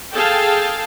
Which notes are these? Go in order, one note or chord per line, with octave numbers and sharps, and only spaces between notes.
G#4 A4 F5 G5 A5